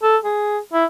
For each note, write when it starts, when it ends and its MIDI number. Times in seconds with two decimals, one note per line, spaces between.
0.03 0.17 69
0.24 0.58 68
0.73 0.85 64